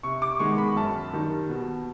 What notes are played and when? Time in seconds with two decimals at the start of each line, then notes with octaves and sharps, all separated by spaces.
0.03 C3 C#6
0.22 D6
0.40 D#3 G#3 B3 C#6
0.58 B5
0.76 F#2 A5
1.13 D#3 G3
1.49 B2